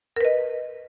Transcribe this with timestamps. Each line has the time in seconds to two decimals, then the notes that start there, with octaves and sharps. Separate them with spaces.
0.16 A#4
0.21 B4
0.25 D#5